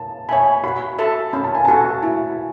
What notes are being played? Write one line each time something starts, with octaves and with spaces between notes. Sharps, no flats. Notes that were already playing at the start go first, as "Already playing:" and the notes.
Already playing: A5
C#5 E5 G#5 B5
F#4 B5
A4 E5 A5
C#4 B5
A5
G#5
F#4 A4 A5
E4